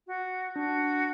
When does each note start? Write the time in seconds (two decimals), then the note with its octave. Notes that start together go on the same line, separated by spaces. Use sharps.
0.07 F#4
0.56 D4 F#4